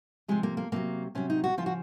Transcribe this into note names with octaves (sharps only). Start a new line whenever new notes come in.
C3 F3 G#3
A#3
A#3
C3 D#3 F#3 A#3
C3 F#3 C#4
D#4
F#4
C#3 F3 F4
F#4